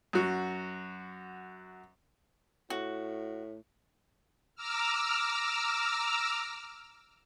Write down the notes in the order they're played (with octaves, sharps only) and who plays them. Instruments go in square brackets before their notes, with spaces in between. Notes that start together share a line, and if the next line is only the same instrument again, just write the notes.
[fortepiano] F#2 F#4
[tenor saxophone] A2 [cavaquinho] F#4
[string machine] A#5 D6 E6 F6